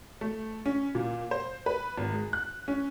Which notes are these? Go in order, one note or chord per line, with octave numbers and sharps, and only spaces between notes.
A3
C#4
A#2
C5
B4
G#1
G#3
F#6
C#4